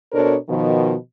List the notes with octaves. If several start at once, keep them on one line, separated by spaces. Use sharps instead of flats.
B2 D4 A4 A#4 C5 C#5
B2 D#3 F3